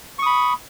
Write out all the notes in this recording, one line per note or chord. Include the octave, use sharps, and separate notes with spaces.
B5 C#6 D#6